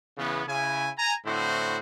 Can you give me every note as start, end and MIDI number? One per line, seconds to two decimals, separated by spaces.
0.18 0.44 49
0.18 0.44 52
0.18 0.44 56
0.18 0.44 59
0.47 0.90 49
0.47 0.90 64
0.47 0.90 80
0.98 1.15 80
0.98 1.15 82
1.26 1.78 45
1.26 1.78 50
1.26 1.78 60
1.26 1.78 64
1.26 1.78 66
1.26 1.78 72